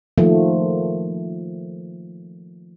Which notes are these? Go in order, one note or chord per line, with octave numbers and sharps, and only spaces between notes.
D#3 F3 A3 A#3